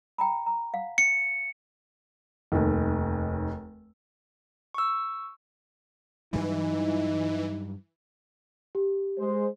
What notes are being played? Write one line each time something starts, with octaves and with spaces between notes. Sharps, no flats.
G5 A#5 B5
A#5
F5 F#5
C#7
F1 D#2
C#6 E6
G2 E3 F#3 G3 D#4
G4
G#3 C5